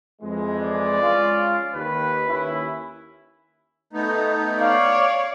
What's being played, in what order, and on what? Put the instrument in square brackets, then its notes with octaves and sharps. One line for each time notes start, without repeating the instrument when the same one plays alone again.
[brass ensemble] F2 E3 G#3
[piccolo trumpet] D5
[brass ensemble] G#3 C#4 F4
[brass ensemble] D#2 [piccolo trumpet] B4
[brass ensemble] D#2 C#4 E4
[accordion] A3 B3 D#4
[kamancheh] C#5 D5 [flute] F5